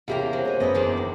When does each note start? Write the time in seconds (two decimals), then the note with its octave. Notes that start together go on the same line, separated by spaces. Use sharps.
0.08 E2 C3 A#3 C#4 G4 F5 A#5
0.33 F#3 C5
0.45 G#4 D#5
0.60 F#1 B3 C#4 E4 D#5
0.74 E2 A#3 D4
0.97 D#3